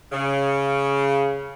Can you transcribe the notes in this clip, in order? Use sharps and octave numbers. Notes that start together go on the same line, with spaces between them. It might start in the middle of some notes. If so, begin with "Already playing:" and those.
C#3